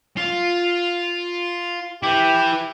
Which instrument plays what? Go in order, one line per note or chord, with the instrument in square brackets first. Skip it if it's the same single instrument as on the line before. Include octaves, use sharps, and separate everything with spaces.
[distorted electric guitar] F4
[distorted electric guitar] E4 B4 [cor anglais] G4